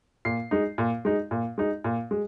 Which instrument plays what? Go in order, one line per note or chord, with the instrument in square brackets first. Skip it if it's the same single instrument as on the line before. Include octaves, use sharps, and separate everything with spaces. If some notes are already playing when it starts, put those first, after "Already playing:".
[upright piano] A#2 C7
G#3 D#4
A#2
G#3 D#4
A#2
G#3 D#4
A#2
G#3